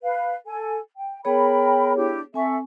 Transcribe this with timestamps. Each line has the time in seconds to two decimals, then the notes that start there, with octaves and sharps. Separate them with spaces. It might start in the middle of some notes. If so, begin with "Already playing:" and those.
0.02 B4 F5
0.46 A4 G#5
0.96 G5
1.25 B3 G#4 A#4 C#5 G5 B5
1.95 D4 E4 G4
2.34 C4 A4 E5 G#5 C#6